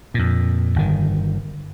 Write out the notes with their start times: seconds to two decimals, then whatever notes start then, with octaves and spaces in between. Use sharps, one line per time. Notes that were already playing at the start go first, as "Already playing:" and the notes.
0.14 F2 A#2
0.76 G1 D#3